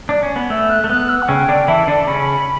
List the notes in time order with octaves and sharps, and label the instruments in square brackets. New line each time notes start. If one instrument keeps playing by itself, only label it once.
[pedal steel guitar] D4
C#4
B3
[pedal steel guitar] A3 [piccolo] E6
[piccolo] F#6
[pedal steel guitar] A3
[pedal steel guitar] B3 [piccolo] F#6
[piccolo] E6
F#5
[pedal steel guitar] C#3 C#4 [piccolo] G5
[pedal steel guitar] D3 D4
[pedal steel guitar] E3 E4 [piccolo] A5
[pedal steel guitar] D3 D4
[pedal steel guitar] C#3 C#4 [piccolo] B5